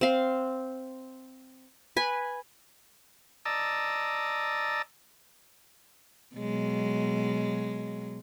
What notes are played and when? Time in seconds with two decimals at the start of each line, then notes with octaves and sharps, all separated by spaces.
0.01 C4 F5
1.96 B4 G#5
3.45 D5 D#5 A5 A#5 E6
6.36 B2 F#3 G#3